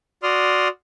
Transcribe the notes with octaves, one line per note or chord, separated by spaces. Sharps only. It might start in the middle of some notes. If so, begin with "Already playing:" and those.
F#4 D5 C6 D#6 F6